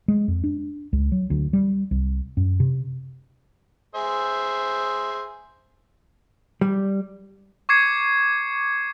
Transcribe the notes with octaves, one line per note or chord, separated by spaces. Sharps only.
G#3
F2
D4
C#2
F#3
D2
G3
C2
F#2
C3
G#4 C5 E5
G3
C#6 D6 G#6 C7 C#7